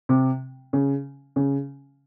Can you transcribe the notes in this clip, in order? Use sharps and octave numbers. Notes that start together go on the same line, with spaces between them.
C3
C#3
C#3